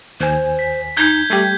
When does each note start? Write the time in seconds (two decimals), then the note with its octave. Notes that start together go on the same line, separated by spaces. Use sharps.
0.20 D#2 C5 G#5
0.59 B6
0.97 D#4 G6 G#6 G7
1.30 G3 A3 G4